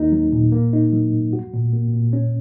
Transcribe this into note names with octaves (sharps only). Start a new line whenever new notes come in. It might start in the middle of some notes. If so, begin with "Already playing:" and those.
Already playing: D#2 A#3 D#4
F#3
A#2
A#3
D#4
F#3
G#2
F#4
A#2
A#3
A#2
C#4